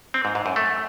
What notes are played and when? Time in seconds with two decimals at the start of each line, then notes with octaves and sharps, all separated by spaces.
0.14 C4
0.25 G#2
0.35 G#2
0.46 F#2
0.56 A3